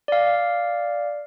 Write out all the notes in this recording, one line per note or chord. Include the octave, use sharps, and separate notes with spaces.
D5 F5